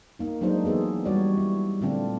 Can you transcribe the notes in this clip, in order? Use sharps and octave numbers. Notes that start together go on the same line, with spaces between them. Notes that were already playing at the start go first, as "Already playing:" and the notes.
A#3 D#4
F#3 G#3 A#3 D4 D#4 C5
E3 B3 G#4 A4
G3 G#3 F#4 C#5 D5
E4
A#2 D3 A3 C4 D4 F4